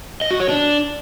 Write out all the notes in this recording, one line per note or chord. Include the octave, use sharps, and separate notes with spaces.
D#5
F#4
C#5
D4